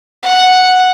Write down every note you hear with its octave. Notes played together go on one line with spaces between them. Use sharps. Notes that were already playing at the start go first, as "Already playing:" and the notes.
F#5